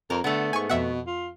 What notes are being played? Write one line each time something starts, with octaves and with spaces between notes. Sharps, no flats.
F2 A#4
D3 A3 B3
G#2 G#5 C#6
F2 B2 E5 F#5
F4